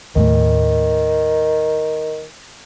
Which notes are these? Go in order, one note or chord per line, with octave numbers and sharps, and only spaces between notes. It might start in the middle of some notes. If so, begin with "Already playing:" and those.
D#2 A2 D#3 A3